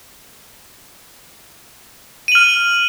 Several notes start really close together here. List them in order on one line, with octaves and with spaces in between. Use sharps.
D#7 F#7 F6